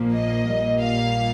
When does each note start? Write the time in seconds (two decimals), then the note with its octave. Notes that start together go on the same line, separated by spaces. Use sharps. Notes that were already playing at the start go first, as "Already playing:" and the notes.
Already playing: A#1 A#2 F3 A#3
0.14 D#5
0.47 A#1 A#2 G3 A#3
0.82 F5